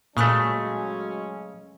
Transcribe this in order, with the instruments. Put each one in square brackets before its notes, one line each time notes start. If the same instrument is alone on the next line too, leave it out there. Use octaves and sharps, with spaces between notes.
[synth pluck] A#2 F6 F#6 [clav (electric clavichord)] C#3 A3 [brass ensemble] F#3 G#3 C#4